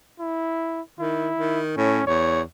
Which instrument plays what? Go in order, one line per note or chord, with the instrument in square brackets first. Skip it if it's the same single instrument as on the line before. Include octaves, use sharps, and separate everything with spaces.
[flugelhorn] E4
[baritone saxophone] D#3 [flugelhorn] E4
[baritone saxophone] D#3
[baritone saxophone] A2 [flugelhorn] C#4
[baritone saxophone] E2 [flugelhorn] C#5